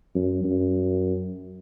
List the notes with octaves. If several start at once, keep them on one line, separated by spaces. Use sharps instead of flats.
F#2
F#2